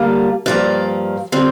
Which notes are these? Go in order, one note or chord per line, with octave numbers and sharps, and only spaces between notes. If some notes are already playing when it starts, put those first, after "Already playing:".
Already playing: D3 G3 A#3 F4
G2 F3 A#3 D5
D3 G3 C4 F4